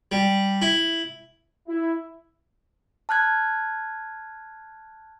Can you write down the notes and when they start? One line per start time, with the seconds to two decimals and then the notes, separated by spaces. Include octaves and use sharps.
0.12 G3
0.62 E4
1.68 E4
3.09 A5 F6 F#6 G#6